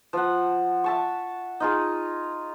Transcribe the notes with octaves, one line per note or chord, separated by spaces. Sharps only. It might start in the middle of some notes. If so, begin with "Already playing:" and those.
F3 F#5
E5 A5 C#6
D#4 F4 G#4